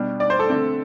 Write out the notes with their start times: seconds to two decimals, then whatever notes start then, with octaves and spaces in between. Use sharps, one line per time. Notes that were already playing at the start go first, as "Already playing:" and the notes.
Already playing: B2 G3 D4
0.20 D5
0.30 C5
0.39 A4
0.50 D3 A3 C4